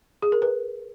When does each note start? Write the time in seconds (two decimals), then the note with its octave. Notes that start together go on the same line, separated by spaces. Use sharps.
0.22 G#4
0.32 A#4
0.42 B4